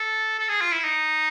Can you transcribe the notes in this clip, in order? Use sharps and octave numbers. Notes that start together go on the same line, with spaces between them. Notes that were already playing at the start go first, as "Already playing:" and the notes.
Already playing: A4
A4
G#4
F4
E4
D#4